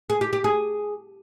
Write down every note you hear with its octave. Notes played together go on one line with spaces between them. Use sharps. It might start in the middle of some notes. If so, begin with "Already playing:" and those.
G#4
G4
G4
G#4